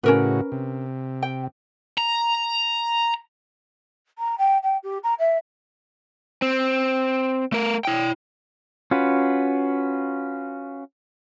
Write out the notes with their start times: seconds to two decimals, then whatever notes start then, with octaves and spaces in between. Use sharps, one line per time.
0.04 A2 C#3 C#4 F#4 A#4 B4
0.52 C3
1.23 G5
1.98 A#5
4.19 A#5
4.38 G5
4.63 G5
4.83 G4
5.04 A#5
5.19 E5
6.42 C4
7.52 A3 A#4
7.85 E4 G5
8.91 C#4 F4 F#4 B4